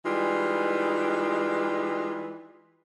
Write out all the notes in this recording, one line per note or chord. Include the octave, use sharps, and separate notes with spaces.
E3 G3 G#3 D#4 F4